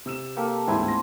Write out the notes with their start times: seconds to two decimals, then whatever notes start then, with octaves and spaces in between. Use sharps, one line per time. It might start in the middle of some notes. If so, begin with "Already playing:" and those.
0.06 C3 E6 E7
0.37 A#3 G4 A4
0.68 A1 D2 G#2 C4 E4 G#5
0.88 A#6